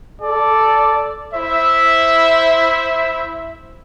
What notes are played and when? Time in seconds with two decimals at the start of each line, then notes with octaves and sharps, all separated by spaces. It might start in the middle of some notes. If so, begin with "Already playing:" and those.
0.22 A4 D5
1.34 E4 C5 E5